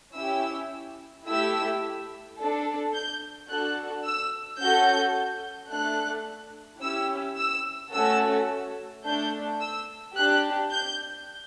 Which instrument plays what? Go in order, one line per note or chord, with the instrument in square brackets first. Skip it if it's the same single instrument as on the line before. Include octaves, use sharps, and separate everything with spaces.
[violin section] C#4 E4 G4 E6
A3 E4 G4 E6
D4 A4
G6
D4 F#4 A4 F#6
E6
C#4 F#4 A4 G6
A3 D4 A4 F#6
C#4 E4 G4 E6
E6
A3 C#4 F#4 A4 E6
A3 D4 A4 G6
E6
D4 G4 F#6
G6